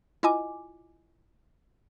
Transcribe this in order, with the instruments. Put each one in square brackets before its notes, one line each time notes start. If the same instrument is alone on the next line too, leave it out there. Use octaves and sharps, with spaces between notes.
[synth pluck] E4 F4 D#5 G#5 D6